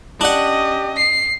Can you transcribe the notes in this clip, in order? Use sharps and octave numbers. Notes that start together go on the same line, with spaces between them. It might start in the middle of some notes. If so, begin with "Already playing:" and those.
C#4 D4 G4 D#5 F#5
C7